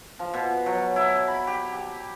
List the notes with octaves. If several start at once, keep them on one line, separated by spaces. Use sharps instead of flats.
F3
B2
F#3
E4
B5
G4
G4